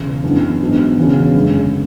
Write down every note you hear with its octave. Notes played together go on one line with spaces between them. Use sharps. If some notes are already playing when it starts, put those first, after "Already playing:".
Already playing: E1 E2 C#3
F#2 E3 B3 D4
G#2 F#3 B3 D4
E1 E2 C#3 F#3 C#4
F#1 F#2 D3 G#3